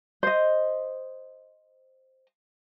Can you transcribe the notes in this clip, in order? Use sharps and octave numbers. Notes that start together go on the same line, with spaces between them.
C5 D#5